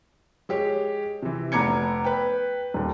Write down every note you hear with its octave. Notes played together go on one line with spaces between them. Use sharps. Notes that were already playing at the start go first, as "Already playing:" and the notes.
G#3 G4 C#5
C3 E3
F1 B3 A#5 D6 G#6 C#7
B4 G5
D#1 D#2